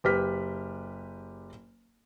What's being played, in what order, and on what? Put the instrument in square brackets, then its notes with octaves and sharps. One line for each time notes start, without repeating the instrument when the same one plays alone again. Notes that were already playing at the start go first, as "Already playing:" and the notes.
[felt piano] F#1 G4 B4 F6 B6